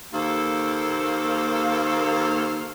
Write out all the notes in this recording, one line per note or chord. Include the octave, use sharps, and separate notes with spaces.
D#2 A#3 A4 C5 F5